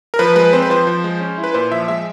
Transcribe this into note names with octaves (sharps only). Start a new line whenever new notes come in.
A#4
F3 B4
G#3 B4
C4 C5
B4
F3 C5
F3
G#3
C#4
E4
B4
A#2 C5
F3 E5
G#3 E5